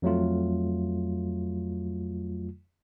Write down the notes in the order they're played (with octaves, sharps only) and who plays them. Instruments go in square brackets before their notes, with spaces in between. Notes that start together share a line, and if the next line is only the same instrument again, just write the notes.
[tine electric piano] F2 F#3 A3 F4